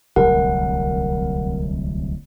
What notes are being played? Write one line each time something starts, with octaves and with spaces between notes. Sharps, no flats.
D1 C2 F#3 A#4 F#5